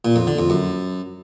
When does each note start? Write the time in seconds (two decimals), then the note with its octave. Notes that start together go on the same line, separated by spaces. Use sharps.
0.05 A#2
0.16 F2
0.27 D3
0.39 F2
0.50 F#2